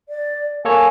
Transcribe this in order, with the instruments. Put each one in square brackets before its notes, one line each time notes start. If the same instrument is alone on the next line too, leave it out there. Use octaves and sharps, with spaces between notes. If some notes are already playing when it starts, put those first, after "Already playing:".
[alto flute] D5
[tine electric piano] A#3 A4 C#5 [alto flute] G#5